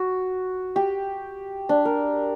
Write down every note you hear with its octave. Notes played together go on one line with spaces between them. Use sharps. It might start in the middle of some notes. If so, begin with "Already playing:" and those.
Already playing: F#4
G4
D4
A#4